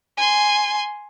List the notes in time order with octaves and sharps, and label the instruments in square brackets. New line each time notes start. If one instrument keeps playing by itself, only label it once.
[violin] G#5 C6